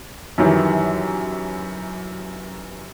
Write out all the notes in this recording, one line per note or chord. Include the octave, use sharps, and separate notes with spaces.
F#2 D#3 E3 G3